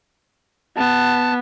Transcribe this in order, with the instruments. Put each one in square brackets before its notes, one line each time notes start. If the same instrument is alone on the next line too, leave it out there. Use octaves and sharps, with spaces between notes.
[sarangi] B3 [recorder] A5